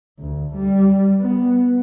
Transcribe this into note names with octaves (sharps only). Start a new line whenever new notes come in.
D2
G3
B3